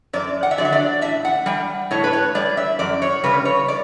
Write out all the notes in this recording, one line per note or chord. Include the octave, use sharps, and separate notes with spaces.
F#2 D5
F#5
E5
D3 F#3 D5
E5
D5
A2 E5
F#5
G3 G5
A2 C#5
B4
C#5
G3 D5
E5
F#2 D5
C#5
C#3 G3 B4
C#5
D5